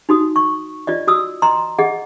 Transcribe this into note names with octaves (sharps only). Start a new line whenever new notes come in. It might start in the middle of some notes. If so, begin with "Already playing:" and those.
D#4 F#4 D#6
C#6
F4 D5 D#5
F#4 D#6 E6
D#5 A#5 C6
G#4 D#5 F#5